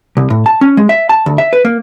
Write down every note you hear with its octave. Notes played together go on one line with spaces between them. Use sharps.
C2
A2
A5
C#4
G#3
E5
A5
D2
E5
B4
A#3